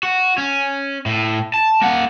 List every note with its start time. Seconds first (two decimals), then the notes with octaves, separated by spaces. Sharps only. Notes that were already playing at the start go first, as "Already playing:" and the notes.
0.03 F#4
0.38 C#4
1.06 A2
1.54 A5
1.82 A#3 F#5